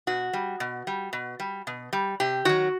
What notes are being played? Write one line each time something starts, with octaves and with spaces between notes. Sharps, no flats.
B2 F#4
G3
B2
G3
B2
G3
B2
G3
C3 G4
D#3 F#3 F#4